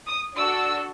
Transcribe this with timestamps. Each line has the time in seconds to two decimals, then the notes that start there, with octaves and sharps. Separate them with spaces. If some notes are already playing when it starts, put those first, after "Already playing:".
0.09 D#6
0.37 D4 F#4 A4 E6